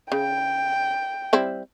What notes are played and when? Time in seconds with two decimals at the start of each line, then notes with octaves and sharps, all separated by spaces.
0.12 C#3 G5
1.33 G3 C4 E4